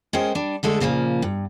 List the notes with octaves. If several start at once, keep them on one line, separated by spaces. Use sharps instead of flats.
G#3 C#4 G#4 A#4 C5 G5
G3 D4
D3 G#3 A3 A4
A#2 C#3 F3 A3 A#3
G2